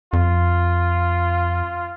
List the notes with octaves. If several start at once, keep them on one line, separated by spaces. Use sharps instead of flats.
F2 F4